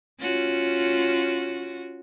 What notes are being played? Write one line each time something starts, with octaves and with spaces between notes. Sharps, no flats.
C#4 F4 F#4